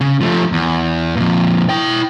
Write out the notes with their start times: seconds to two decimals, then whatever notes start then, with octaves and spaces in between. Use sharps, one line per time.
0.01 C#3
0.21 F3 A3
0.52 E2
1.16 F2 A#2
1.69 E4 G5